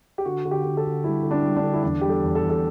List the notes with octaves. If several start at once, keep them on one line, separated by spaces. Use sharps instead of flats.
G4
D3 F#4
D3
G4
D3
A4
D3
G3 E4
D3
D4
G3
D4
D3
E4
E2 D4
G3 G4
A4
E2
A4
E2
A4